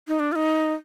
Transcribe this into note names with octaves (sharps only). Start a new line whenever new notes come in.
D#4
D4
F4
D#4